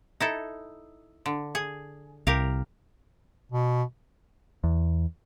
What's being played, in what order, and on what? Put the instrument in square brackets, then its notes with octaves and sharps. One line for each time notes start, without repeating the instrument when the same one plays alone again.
[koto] D#4 E4 A4
D3
G#4
[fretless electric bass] C2 [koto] G4 A#4 F5
[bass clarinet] B2
[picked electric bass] E2